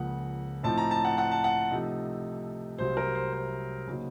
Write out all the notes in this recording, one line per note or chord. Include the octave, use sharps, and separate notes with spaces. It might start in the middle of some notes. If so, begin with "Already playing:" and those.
Already playing: C#2 C#3 F3 A#3 F#5
A2 F3 C4 D#4 A5
A#5
A5
F#5
F#5
A5
F#5
C3 F3 A3 D#4
C2 C3 F#3 C5
A#4
C5
C5
C#3 F#3 A#3 D#4